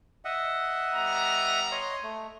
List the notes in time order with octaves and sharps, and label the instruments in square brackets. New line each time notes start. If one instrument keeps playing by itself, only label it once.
[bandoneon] D#5 E5 F#5
[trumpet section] G3 B3 A#5
[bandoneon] C#5 D#5 C6
A3